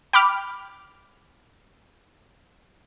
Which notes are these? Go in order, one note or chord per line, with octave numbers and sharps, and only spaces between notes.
G5 B5 D6 F6